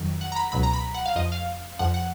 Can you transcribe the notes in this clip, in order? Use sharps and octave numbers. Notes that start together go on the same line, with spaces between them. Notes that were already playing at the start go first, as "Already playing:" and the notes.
Already playing: F2 D#3 F#3
F#5
A#5
B5
C#2 B2 F#3 B5
A#5
B5
F#5
F5
F2 F3 D#5
F5
F2 F3 F#5
F#5